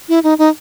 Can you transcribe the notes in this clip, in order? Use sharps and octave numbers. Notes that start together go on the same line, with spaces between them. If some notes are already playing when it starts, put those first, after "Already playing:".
E4
D#4
D#4